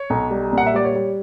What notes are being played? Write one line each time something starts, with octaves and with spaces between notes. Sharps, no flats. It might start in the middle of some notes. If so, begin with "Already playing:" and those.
Already playing: C#5
B1
G3
A#2 F#5
E5
G3 D5
C#5
G3